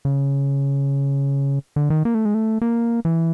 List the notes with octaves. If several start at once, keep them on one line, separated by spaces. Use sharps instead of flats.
C#3
D3
D#3
A#3
A3
G#3
A3
A#3
E3